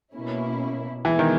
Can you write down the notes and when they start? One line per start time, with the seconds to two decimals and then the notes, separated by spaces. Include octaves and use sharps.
0.15 B2 A#3 C#4 E4
1.05 E2 B2 E3 G#3 B3
1.19 D#3